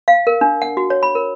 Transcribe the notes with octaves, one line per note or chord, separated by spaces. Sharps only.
F5
A#4
D4
F#5
F#4
C#5
B5
A#4